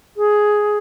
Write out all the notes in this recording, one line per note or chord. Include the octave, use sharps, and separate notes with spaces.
G#4